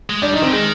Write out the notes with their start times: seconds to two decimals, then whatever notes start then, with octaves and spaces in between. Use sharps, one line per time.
0.10 G#3
0.22 G3 D4
0.33 D#4
0.37 D#3
0.42 C4
0.47 D3
0.52 D#3 G#3